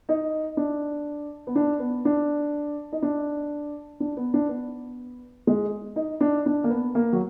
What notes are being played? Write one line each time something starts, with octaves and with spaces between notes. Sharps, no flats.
D#4
D4
B3
D4
B3
D4
D#4
D4
D4
B3
D4
B3
G#3
D#4
D4
D4
A#3
B3
A#3
F#3